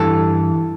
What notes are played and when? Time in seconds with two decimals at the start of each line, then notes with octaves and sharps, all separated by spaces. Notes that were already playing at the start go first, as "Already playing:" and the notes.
Already playing: G2 E3 A4